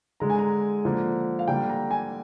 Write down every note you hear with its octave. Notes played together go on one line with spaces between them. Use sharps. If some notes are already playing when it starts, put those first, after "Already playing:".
D3 G#3 A#5
G#5
A#5
D3 F3 A#3
F5
D3 G3 A#3 G5
A#5
G#5